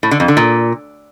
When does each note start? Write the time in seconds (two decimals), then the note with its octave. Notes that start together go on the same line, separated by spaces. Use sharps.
0.03 A2
0.11 D3
0.20 F2
0.28 D3
0.37 A#2